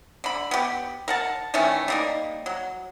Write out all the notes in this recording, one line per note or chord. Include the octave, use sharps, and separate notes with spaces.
D3 B5
B3 G4
A#4 F#5 A5
D#3 E3 A3 C#4
G3 A#3 D#4
F#3